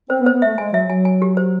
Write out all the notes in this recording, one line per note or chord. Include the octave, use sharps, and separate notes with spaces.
C4 C5
B3
C5
B3
A3 E5
G#3 G#5
F#3 E5
F#3 G#5
G#5
G4
C5